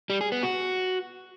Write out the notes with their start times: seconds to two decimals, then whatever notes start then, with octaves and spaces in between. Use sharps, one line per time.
0.10 G3
0.21 G#4
0.32 B3
0.43 F#4